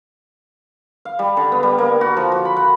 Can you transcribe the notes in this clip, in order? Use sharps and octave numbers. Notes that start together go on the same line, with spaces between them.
F5
G3
D3
B3
G3
A#3
F#4
F3
F#4
B5
F#5